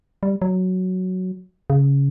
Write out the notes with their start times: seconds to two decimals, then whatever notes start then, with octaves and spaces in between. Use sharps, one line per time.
0.23 G3
0.42 F#3
1.70 C#3